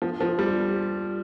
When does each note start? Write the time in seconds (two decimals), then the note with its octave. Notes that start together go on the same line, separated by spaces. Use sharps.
0.02 F3
0.21 F3
0.39 G3